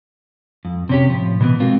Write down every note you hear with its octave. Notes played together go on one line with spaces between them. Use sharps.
F2
C3 C#4 G4
A2 F3
B2 E3 B3
G#3 C4 F4 F#4 A#4